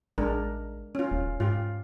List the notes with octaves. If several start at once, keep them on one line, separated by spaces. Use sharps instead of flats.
A1 G#3 D4 A#4
C#4 F4
D#1
G#2 F4 G4